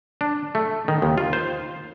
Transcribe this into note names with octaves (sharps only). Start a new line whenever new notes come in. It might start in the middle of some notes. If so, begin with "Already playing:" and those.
D4
A3
D#3
D#2
F4
C5